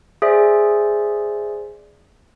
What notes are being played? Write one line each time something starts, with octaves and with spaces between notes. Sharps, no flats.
G#4 C5 D5 E5